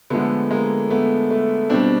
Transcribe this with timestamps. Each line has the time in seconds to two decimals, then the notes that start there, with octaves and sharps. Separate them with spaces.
0.10 D3 F3 G#3 A3 B3
0.51 G#3 A#3
0.90 A3 B3
1.31 A3
1.70 B2 G3 C4 D4